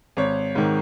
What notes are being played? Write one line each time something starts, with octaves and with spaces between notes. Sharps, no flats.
G#1 C#5
G#2 D#3